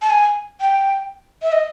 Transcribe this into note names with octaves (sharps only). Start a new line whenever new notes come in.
A5
G#5
G5
E5
D#5